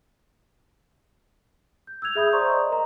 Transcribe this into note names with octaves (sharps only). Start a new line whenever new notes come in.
G6
E6 F#6 G#6 F7
G#4 E5 B5 D#6 G6
C5 D5 A#5 C6 C#6 D#6
D5 D#5
A#4 A#5